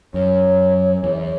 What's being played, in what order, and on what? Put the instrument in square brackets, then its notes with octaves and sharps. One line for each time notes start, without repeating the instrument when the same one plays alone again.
[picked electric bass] F#2 [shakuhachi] C#5
[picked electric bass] E2 [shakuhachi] C#5
[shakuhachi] E5
C#5